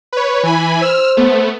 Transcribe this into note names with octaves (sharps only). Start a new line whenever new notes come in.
B4 C#5
E3 G#5 B5
C5 E6 F6
A3 B3